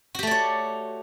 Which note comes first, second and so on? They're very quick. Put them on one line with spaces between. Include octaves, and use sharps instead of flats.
F#4 G4 A3 D5 C#5